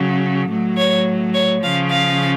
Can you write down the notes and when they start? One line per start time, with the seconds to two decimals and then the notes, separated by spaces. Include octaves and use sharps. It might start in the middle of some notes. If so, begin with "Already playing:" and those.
Already playing: C#3 F#3
0.49 A2 F#3
0.76 C#5
1.34 C#5
1.62 F3 F5
1.66 C#3
1.90 F5